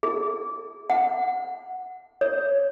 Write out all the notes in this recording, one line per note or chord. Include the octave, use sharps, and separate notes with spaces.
G#4
F#5
C#5